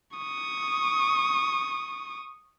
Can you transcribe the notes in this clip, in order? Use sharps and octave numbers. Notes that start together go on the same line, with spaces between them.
C#6 D#6